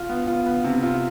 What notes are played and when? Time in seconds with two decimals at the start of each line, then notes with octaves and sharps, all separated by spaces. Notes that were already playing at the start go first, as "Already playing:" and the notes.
Already playing: F4
0.09 B3
0.27 F4
0.46 B3
0.64 C3
0.83 F4